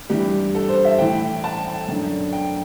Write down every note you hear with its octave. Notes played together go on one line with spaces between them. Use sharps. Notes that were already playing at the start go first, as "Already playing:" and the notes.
G2 E3 G4
A4
C5
E5
A2 E3 G5
A5
F#2 D3
G5